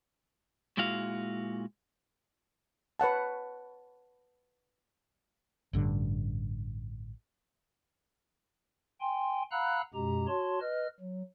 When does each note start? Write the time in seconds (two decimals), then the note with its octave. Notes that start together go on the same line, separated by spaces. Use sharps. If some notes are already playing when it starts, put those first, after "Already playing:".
0.77 A#2 G#3 E4 F#4 F5
3.00 B4 C#5 F#5 A5
5.73 A1 G2 D3
9.01 G5 G#5 C6
9.51 F5 F#5 A#5 B5 E6 F#6
9.94 F#2 B2 G#3 G4 A#5
10.27 F#4 C#5 A5 C6
10.61 B4 D#5 F6
11.00 F#3